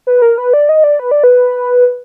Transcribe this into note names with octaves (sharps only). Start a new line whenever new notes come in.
B4
A#4
B4
D5
D#5
D5
B4
D5
B4